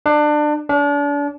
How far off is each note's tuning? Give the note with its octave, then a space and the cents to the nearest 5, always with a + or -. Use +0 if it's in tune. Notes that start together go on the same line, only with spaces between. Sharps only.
D4 +25
D4 -35